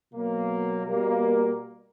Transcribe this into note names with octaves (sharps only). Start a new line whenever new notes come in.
B2 F#3 A#3
B2 G3 A#3